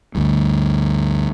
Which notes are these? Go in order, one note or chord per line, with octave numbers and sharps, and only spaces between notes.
D2 G2